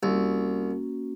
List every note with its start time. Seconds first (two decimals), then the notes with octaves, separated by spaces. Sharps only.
0.03 C2 A#3 C#4 F#4